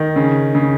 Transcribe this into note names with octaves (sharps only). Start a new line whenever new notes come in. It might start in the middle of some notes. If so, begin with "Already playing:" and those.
Already playing: D#3
C#3
C#3